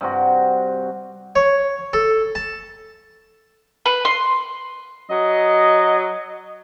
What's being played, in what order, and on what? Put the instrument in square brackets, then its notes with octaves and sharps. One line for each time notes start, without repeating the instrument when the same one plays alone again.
[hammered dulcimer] G2 C3 F#4
[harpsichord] C#5
A4
A5
[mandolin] B4
C6
[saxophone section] F#3 D#5